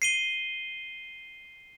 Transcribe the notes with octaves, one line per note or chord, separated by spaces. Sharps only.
C7 D#7 G7